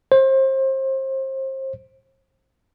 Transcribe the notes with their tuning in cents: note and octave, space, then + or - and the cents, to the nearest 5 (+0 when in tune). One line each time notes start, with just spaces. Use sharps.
C5 +30